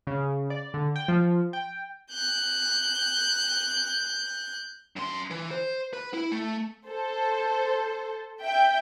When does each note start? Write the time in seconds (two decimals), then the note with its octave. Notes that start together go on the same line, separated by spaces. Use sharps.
0.07 C#3
0.50 D5
0.74 D3
0.96 G5
1.08 F3
1.53 G5
2.12 F#6 G6
4.96 F#2 C6
5.31 E3
5.51 C5
5.93 B4
6.14 E4
6.32 A3
6.87 A4 C5
8.42 E5 G5 G6